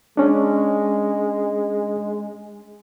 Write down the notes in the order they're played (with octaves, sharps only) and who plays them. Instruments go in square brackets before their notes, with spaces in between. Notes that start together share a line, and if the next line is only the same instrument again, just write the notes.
[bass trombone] G#3 [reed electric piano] C#4 D4